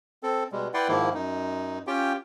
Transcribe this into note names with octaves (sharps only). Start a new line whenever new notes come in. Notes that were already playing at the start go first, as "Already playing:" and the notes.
C4 A4
B2 G3 G#3
E4 B4 D5 F#5 G5 C6
G#2 D#3 F3 A#3 E4
F#2 D#4
C#4 F4 G4 G5